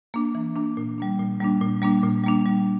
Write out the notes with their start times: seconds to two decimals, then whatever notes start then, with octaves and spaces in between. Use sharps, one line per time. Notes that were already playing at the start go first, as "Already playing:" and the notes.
0.14 A#3 D4
0.35 E3
0.55 A#3 D4
0.77 A#2
0.98 G3 A#3 D4
1.19 A#2
1.40 G3 A#3 D4
1.61 A#2
1.82 G3 A#3 D4
2.04 A#2
2.24 G3 A#3 D4
2.46 G3